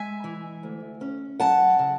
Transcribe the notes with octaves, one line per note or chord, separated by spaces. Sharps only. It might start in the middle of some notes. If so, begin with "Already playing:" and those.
Already playing: G#3 E5 G#5
E3
D2
C#4
F#3 F#5 A5
C#3